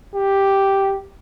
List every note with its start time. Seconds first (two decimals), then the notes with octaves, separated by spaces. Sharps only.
0.14 G4